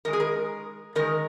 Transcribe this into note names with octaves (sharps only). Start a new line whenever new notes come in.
D#3 G#3 A#4
G#4
A#4
D#3 G#3 A#4